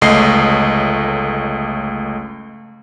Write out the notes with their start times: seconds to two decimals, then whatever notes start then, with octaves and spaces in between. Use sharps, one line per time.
0.02 G1 C#2 A3 D#5 C7